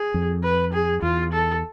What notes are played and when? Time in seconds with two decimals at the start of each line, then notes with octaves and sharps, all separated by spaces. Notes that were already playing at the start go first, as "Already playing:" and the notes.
Already playing: G#4
0.14 F2
0.44 B4
0.73 G#4
1.02 E2 F4
1.33 A4